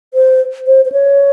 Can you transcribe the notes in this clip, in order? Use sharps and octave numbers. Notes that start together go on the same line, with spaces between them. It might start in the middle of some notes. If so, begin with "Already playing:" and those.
C5
C5
C5
C#5